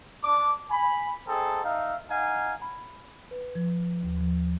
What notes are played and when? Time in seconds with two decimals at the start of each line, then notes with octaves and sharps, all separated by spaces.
0.23 D4 D6
0.70 G#5 B5
1.28 C4 D#4 G#4 A4
1.64 D#4 E5 F5
2.10 D#4 F5 F#5 G#5
2.62 B5
3.31 B4
3.55 F3
4.03 D#2
4.21 F3